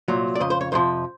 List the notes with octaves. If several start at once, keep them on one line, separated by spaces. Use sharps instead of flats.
C2 A#2 F#3
D5
F2 C#3 D#5
C5
C#5
F2 C3 F3 C5